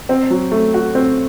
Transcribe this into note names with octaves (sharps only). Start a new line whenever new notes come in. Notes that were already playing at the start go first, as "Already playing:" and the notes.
C4
F#3
A3
F#4
C4